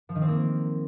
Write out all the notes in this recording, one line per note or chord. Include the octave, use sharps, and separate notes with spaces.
F3
D#3
C4
A#3